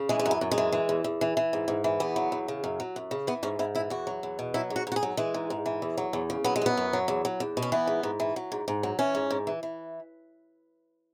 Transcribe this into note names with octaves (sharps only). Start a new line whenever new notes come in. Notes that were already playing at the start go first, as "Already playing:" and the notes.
Already playing: C#3
E3 G#3
G#3
F#2
B3
F#2
G#3
E3
E3
E2
E2
E3
E3
G#2
G#2
E3
E2 B3
F#3
E2
C#3
F#2
F#3
F#2
C#3
E3 B3
G#2 C#4
G#2 E4
E3 E4
E2 F#4
F#3
E2
B2
F#3 E4
G#2
F#4
G#2 F#4
G#4
F#3
E3 G#3
G#2
G#2
E3
E2
F#3
E2
C#3
F#3 B3
G#3
F#2 B3
F#2
F#3
E2
F#3
E2
B2
C#4
E3 B3
G#2
G#2
E3
F#3
G#2
G#2
F#3
E3 C#4
G#2
G#2
E3
E3